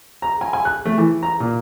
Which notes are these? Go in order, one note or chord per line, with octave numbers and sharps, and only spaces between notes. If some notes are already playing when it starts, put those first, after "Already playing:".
A#5
G#5
G#5
F#6
A3
E3
A#5
A#2